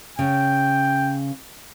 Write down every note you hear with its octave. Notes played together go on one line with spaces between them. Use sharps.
C#3 G5